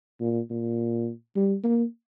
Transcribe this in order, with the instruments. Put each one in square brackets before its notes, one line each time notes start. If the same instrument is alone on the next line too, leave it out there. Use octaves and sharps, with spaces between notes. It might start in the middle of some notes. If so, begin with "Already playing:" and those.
[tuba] A#2
A#2
G3
A#3